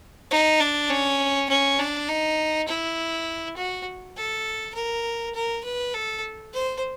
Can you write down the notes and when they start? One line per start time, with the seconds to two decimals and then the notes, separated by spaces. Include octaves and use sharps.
0.31 D#4
0.60 D4
0.90 C#4
1.49 C#4
1.79 D4
2.08 D#4
2.68 E4
3.57 F#4
4.16 A4
4.75 A#4
5.35 A#4
5.64 B4
5.94 A4
6.53 C5